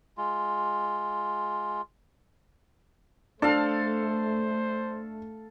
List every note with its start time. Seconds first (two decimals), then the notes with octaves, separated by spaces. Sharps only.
0.18 G#3 F4
3.42 A3 D4 A4 C5 F5